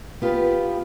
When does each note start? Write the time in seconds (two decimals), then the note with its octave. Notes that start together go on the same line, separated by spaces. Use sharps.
0.22 B3 F4 G4 A#4 B4